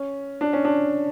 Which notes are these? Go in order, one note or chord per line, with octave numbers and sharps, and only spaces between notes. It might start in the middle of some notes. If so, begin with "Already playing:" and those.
Already playing: C#4
D4
C#4
D4